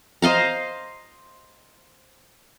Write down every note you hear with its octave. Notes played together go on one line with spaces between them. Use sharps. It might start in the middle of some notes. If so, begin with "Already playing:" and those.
C5 D#5 F5 A#5